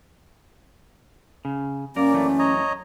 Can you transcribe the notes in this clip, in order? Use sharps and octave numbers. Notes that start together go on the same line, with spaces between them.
C#3
F#2 A#3 C#4 A#4 D5
F#2 E3 A3
C#5 D#5 A#5